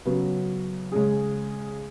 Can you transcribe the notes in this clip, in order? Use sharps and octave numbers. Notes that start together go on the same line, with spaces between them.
C#3 F#3 B3
C#3 G#3 C#4 G#4